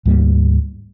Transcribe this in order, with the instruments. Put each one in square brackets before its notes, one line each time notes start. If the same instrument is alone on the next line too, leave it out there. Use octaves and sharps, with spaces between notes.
[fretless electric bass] D2 G#2 G3 A#3